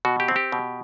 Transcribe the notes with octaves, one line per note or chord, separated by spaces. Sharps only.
B2 F#4
G4
C4
G4
B2